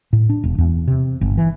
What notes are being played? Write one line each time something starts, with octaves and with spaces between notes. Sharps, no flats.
A2
D4
E1
E2
C3
G1
E3